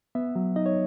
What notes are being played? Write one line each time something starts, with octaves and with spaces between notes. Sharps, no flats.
B3 E5
F#3
D#4 D#5
C#5